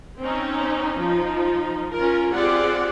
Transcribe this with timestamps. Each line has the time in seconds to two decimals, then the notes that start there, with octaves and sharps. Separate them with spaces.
0.19 C4 C#4 D#4
0.98 F3 D#4
1.93 C#4 F4 A#4
2.32 C4 F4 G4 G#4 D5 F#5